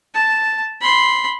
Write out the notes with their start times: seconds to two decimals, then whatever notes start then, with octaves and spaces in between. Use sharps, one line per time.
0.14 A5
0.80 B5 C6